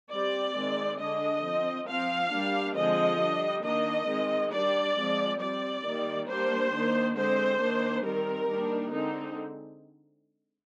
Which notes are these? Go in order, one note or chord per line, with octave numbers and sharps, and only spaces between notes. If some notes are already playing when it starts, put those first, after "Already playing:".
G3 C4 D5
D#3 G#3 C4
D3 G#3 D4 D#5
F3 C4
F3 C4 F5
G3 A#3 D4
D3 F3 G#3 C4 D#5
G3 D4
D#3 A#3 D4 D#5
D#3 G#3 C4
G3 D4 D5
F3 G#3 C4
G3 C4 D5
D#3 G3 A#3
G3 A#3 D4 C5
D#3 A#3 D4
D3 G#3 C4 C5
D#3 A#3 D4
D#3 G3 C4 A#4
D#3 G3 A#3 D4
D3 G#3 C4 D#4